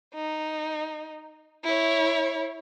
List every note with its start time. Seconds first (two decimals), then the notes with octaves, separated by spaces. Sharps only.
0.14 D#4
1.64 E4 C#5